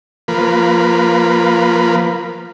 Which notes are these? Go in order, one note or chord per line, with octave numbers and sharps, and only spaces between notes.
F3 A#3 B4